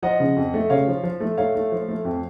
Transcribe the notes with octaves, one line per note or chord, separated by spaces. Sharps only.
F3 D#5 F#5
C#3
F2
A3
C#3 C#5 F5
F3
F3
A3
A3 C#5 F5
A3
F3
A3
F2